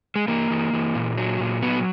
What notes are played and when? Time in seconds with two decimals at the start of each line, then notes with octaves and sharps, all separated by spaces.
0.16 G#3
0.28 E3 A#3
0.50 E3
0.73 E3
0.95 A#2
1.17 F#3
1.40 A#2
1.62 F#3 B3